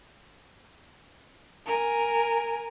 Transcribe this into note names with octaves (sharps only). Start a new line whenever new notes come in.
A#4 G#5